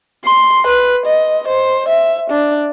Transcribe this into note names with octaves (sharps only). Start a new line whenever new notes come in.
C6
B4
D#5
C5
E5
D4